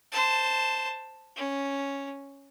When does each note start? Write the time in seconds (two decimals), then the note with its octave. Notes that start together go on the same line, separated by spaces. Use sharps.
0.12 C5 A5
1.36 C#4